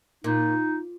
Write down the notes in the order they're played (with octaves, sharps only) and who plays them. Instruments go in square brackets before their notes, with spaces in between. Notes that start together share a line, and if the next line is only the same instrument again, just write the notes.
[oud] A#2 [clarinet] D#4